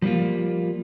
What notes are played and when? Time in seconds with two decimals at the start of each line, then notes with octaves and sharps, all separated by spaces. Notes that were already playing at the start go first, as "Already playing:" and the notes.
0.02 F3 G3 G#3 A#3 F4